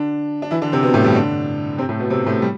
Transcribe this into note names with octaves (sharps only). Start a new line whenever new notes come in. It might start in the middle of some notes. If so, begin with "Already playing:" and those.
Already playing: D3 D4
D4
E3 E4
D3 D4
C3 C4
B2 B3
A2 A3
G2 G3
D3 D4
C3 C4
A2 A3
B2 B3
C3 C4
A2 A3
G3